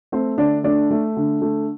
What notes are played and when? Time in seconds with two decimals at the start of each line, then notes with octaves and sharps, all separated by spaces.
0.12 A3 C4 C5
0.38 D3 D4 D5
0.64 A3 D4 D5
0.90 A3
1.17 D3
1.42 A3